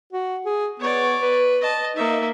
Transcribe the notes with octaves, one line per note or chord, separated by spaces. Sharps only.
F#4
G#4
B3 C#5 D5
B4
D#5 A5
A#3 D#4 E5